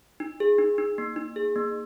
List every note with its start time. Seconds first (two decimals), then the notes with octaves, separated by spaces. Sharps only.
0.20 D#4
0.40 G#4
0.58 D#4
0.78 D#4
0.98 A#3
1.16 D#4
1.36 G#4
1.56 A#3